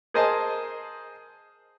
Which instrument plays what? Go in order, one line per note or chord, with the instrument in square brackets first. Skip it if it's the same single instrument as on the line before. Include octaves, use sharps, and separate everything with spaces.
[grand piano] G#4 A#4 C5 D#5 G#5 A5